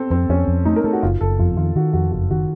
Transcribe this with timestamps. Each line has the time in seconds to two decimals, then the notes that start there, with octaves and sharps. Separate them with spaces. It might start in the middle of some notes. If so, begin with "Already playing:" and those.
Already playing: C4 A4
0.10 F2 C4
0.29 F2 C#4
0.48 F2
0.65 A3 D#4
0.76 A#4
0.84 A3 A4
0.93 F#4
1.03 F#1 F4
1.21 F#1 A4
1.39 F2 F4
1.57 D#3 F4
1.76 D#3 F#4
1.93 F2 F#4
2.12 F#1 F#4
2.30 D#3 F#4